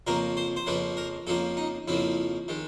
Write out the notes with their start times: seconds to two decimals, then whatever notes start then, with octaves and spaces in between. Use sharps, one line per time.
0.07 F2 C#3 F3 A#3 A#4
0.37 C5
0.56 C5
0.66 F2 C#3 F3 A#3 B4
0.97 A#4
1.27 F2 C#3 F3 A#3 A4
1.57 D#4
1.88 F2 C#3 F3 A#3 E4
2.48 D#3 G#3